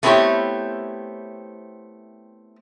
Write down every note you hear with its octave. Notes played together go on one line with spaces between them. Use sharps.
A3 B3 C4 E4 G4 C#5